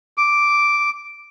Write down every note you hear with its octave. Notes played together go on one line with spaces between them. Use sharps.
D6